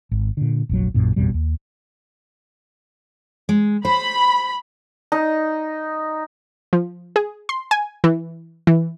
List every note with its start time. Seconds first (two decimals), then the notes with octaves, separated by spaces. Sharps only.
0.11 G#1
0.37 A#2 D3
0.69 F1 A#1 F#3
0.94 A#1 F#2 A#2
1.16 A1 F2 B2 G3
1.34 D#2
3.49 G#3
3.85 C5 B5
5.12 D#4
6.73 F3
7.16 G#4
7.49 C6
7.71 G#5
8.04 E3
8.67 E3